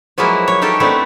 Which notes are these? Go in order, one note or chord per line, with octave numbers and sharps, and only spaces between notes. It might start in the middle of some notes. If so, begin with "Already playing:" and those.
F3 F#3 G#3 A#3 B3 E4
C#5
D#4 G4 A4 A#4 C#5
A3 B3 C4 D4 E4